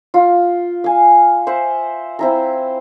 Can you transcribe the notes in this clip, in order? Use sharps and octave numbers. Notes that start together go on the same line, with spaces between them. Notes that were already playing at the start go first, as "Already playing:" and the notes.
F4
F5 G#5
C5 E5 F#5
C4 E4 A#5